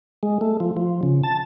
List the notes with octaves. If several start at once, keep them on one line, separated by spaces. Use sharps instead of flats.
G#3
A3
F3
F3
C#3
A5